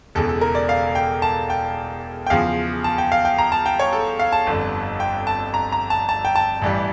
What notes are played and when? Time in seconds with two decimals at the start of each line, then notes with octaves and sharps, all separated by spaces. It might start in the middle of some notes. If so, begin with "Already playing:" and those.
0.15 E1 E2 C#3 A4
0.29 A4
0.41 A#4
0.55 D5
0.69 F5
0.95 G5
1.22 A5
1.50 G5
2.27 G5
2.30 E2 C#3 F3 F5
2.84 A5
2.98 G5
3.12 F5
3.25 G5
3.38 A#5
3.52 A5
3.66 G5
3.80 C#5
3.93 A4
4.19 F5
4.32 A5
4.47 G1 F2 D3
5.00 G5
5.27 A5
5.54 A#5
5.72 A#5
5.90 A5
6.09 A5
6.25 G5
6.35 A5
6.62 A1 G2 E3 G3